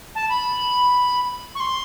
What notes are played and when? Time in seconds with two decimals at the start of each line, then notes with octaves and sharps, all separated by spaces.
0.15 A5
0.29 B5
1.55 C#6
1.60 C6